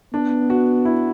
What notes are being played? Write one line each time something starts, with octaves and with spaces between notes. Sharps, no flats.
B3 D4
F#4
E4